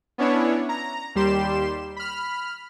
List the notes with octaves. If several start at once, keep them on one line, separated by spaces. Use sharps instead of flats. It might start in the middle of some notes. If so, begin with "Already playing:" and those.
B3 C#4 D4 E4 C#5
A#5
D#2 G3 G4 C6 E7
B5 F6